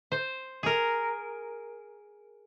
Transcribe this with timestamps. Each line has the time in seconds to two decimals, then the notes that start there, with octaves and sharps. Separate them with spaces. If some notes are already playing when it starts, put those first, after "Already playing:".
0.12 C5
0.63 G#4 A#4